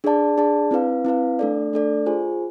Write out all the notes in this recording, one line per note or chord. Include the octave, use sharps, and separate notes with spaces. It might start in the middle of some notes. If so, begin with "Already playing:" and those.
D4 G#4 D5 A5
D4 G#4 D5 A5
C4 E4 B4 F5
C4 E4 B4 F5
A3 D4 A4 D5
A3 D4 A4 D5
F4 G#4 C5 G#5